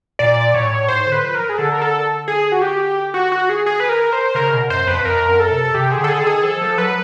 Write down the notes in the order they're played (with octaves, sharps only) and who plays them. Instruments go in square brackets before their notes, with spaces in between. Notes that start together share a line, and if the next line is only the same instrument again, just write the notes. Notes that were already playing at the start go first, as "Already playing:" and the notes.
[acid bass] A#2 [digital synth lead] D5
[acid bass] A2 [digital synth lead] C#5
[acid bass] G#2 [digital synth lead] C5
[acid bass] D3
[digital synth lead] B4
[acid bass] F3
[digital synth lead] A#4
G#4
[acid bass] D3 [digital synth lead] A4
[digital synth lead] A#4
A4
G#4
F#4
G4
F#4
F#4
G#4
G#4
B4
A#4
C5
[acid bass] C#3 [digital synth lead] A#4
[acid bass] B2
[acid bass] F#2 [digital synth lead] C5
[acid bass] F2 [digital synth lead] B4
[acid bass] F2 [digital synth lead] A#4
[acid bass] F#2
[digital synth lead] A4
[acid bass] C3
[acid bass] C3 [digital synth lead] G4
[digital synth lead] G#4
[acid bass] D3
[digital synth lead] A4
G#4
[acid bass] D#3 [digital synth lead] A4
[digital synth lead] G#4
[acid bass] F3 [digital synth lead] A4
[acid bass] F3
[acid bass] F#3 [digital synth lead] B4